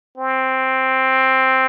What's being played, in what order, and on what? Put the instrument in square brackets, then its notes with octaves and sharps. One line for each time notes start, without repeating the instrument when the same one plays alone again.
[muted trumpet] C4